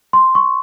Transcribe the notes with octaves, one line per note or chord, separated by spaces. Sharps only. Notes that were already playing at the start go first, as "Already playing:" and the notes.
C6
C#6